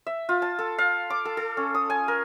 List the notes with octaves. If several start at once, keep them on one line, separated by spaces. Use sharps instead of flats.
E5
F4
A5
A4
F5
D6
A4
A4
C#4
D#6
G#5
A#4